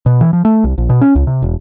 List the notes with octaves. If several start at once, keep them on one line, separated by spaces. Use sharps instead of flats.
B2
E3
F3
A3
C2
A#1
B2
C#4
C#2
C3
E1